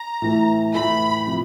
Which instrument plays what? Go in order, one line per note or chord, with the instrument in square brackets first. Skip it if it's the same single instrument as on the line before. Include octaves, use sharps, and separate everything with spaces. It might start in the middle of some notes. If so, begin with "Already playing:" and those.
Already playing: [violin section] A#5
[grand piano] A2 E3 A3
[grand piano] A2 E3 A3 [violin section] B5
[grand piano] C3 F3